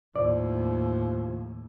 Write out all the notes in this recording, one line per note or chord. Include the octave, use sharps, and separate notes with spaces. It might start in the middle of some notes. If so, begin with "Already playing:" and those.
D#2 A2 F3 D5